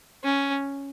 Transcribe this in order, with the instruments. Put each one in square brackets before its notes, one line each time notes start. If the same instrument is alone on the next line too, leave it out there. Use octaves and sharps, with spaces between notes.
[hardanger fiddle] C#4